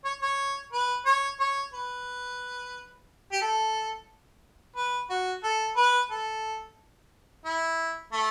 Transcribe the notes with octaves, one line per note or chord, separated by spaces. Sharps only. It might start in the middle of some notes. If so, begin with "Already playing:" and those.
C#5
C#5
B4
C#5
C#5
B4
G4
A4
B4
F#4
A4
B4
A4
E4
A3